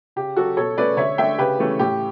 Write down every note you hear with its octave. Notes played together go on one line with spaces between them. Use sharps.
C#3 G4
F#3 C#4 F#4 A4
B2 A4 C#5
A3 C#4 B4 D5
D3 C#5 E5
A3 D4 E5 G5
C#3 G4 B4
E3 A3 C#4
A2 G4